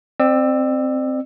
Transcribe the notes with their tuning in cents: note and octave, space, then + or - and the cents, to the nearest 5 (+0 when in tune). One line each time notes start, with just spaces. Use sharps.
C4 +0 D5 +40 E6 +0